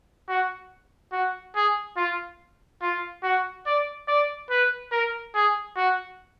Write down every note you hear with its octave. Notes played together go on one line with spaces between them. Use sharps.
F#4
F#4
G#4
F4
F4
F#4
D5
D5
B4
A#4
G#4
F#4